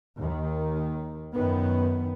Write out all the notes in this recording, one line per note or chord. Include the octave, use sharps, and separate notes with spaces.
D#2 D#3
F#2 D#3 B3